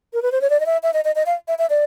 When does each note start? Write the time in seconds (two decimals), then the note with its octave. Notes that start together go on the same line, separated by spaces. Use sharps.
0.13 A#4
0.22 B4
0.32 C5
0.41 C#5
0.50 D5
0.60 D#5
0.66 E5
0.83 E5
0.93 D#5
1.04 D#5
1.15 D#5
1.26 F5
1.48 E5
1.58 E5
1.70 D5